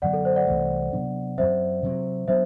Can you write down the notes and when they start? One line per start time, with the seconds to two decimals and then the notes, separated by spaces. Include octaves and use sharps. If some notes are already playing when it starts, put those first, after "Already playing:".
0.02 F#2 D3 F#3 B3 D5 F#5
0.13 A4
0.25 C5
0.36 D5 F#5
0.47 C2 C3 E3 A3
0.93 C3 F#3 B3 D4
1.38 F#2 F#3 C4 C5 E5
1.83 C3 F#3 C4
2.28 F#3 B3 D4 C5 E5